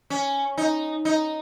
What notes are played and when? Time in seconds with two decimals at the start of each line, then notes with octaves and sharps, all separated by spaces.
0.10 C#4
0.58 D#4
1.05 D#4